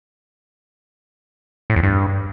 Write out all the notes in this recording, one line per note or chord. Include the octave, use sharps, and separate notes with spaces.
A2
E2
G2